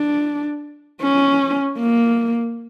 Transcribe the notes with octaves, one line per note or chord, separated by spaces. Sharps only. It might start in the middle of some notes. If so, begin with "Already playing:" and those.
Already playing: D4
C#4
A#3